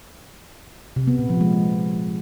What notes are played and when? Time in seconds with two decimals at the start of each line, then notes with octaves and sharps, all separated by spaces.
0.96 C3
1.07 B3
1.19 A#2
1.30 F3
1.41 G#3